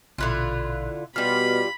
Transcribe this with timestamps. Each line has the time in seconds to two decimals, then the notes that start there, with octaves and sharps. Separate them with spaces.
0.18 A#1 B2 D3 E4 F4 F#6
1.16 B2 G3 F4 B5 F6